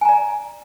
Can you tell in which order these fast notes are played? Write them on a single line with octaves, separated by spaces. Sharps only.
G#5 A#5 D5